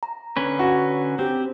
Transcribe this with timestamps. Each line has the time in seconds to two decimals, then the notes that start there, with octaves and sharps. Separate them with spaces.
0.03 A#5
0.37 D3 C#4 B4
0.59 F#4
1.19 C4 G4